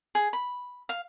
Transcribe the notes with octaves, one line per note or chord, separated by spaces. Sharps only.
G#4
B5
F5